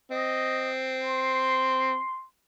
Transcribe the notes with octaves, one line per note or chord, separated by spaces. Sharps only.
C4 D#5
C6